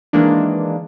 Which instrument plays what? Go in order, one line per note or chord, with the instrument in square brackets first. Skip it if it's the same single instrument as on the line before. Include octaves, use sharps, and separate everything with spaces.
[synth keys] D#3 E3 G#3 A#3 D4